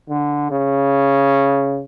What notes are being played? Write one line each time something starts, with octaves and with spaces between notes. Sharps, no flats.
D3
C#3